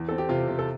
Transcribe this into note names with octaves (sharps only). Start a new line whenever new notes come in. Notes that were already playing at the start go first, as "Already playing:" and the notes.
Already playing: E2
C4 A4
G4
C3 F4
C3
A4